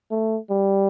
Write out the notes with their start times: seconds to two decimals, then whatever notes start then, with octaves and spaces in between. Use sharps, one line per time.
0.11 A3
0.50 G3